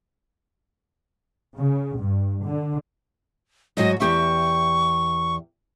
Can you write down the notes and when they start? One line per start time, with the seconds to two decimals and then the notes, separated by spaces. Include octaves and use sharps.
1.59 C#3
1.97 G2
2.44 D3
3.77 G#2 F#3 F#4 D#5
4.00 E2 G4 E5 C#6